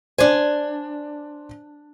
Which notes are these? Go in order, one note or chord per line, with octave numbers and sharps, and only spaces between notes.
D4 C5 D5 G#5